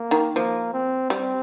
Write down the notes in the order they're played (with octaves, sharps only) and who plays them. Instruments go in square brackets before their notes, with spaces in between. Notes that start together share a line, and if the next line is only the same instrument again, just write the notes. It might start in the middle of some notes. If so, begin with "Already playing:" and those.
Already playing: [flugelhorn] A#3
[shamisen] D#3
[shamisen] F3 [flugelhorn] A#3
[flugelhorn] C4
[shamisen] G3 [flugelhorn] C4